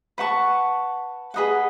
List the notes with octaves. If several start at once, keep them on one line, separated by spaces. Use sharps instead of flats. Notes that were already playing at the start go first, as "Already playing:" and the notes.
B4 F#5 A5 C#6
G#4 B4 D#5 F#5